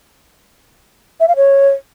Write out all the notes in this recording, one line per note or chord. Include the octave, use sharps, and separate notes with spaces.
E5
F5
C#5